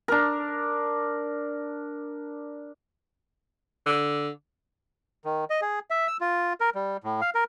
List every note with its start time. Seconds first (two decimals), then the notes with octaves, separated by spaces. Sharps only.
0.08 D4 A#4
3.86 D3
5.25 D#3
5.50 D#5
5.61 G#4
5.91 E5
6.08 E6
6.21 F4
6.61 A#4
6.75 G3
7.04 A2
7.21 F5
7.35 A#4